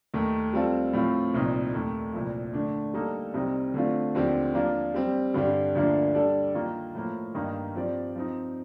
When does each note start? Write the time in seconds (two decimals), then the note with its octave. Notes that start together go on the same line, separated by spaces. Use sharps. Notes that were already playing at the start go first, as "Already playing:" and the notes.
0.14 D#2 D#3 A3
0.53 G3 C4 F4 A4
0.93 A2 F3 C4 F4
1.34 C2 A#2 F3 C4 D#4
1.73 D#2 D#3 A3
2.14 C2 A#2 F3
2.53 D3 A3 D4
2.94 G3 A#3 D#4 A4
3.34 C2 C3 G3 C4 D#4
3.74 D3 A3 C4 F4
4.15 D#2 D3 F3 C4 G4
4.54 F3 A#3 D4 F4
4.94 G3 C4 G4
5.34 G2 D3 G3 D4 G4
5.75 D2 D3 F3 A#3 D4
6.14 G3 D4 A4 D5
6.54 D#3 A#3 F4
6.95 A2 F3 A#3
7.34 G2 D#3 A#3 D#4
7.75 F3 C4 G4 D5
8.15 F3 C4 D#4